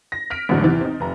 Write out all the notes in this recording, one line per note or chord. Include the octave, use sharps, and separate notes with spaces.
A#6
F6 B6 D7
A1 F2 G#2 D3 F#3 A3
E2 C3 E3 A6
C4 D#4
F1 A#5